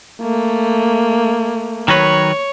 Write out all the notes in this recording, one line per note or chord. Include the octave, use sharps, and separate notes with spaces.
A3 A#3
D#3 F#3 B4 C#5